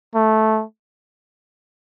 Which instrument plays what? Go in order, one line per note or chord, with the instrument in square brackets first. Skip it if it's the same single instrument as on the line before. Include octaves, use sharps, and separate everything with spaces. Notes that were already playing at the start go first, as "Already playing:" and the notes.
[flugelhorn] A3